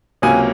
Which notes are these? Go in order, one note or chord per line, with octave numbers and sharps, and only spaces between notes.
C#2 C3 F#3 A#3 C#4 G#5